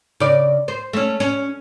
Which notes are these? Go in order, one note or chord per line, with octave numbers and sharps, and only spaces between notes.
C#3 D5
C5
A3 C#4
C#4